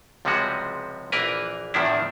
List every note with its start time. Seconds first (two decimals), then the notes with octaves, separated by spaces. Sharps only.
0.25 C#2 C3 F3 G3 G#3 F#4
1.12 A#1 E3 A#3 A#4 B4
1.74 E2 A2 D#3 F3 D4 E4